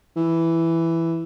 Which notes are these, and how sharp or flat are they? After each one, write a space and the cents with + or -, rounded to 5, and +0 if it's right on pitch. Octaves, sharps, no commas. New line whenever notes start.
E3 +5